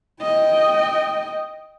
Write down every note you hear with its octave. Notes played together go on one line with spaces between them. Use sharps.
D#5 G5